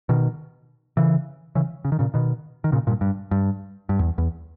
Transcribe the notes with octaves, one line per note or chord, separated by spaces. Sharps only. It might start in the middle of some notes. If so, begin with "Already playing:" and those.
B2 D#3
C#3 E3
C#3 E3
C#3
D#3
A#2 C#3
B2 D#3
D#3
A#2 C#3
G2 A#2
G2
G2
G2
E2
E2